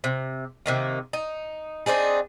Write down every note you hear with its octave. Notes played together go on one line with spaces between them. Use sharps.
C3
C3 D#3 A#3
D#4
C4 D4 D#4 G#4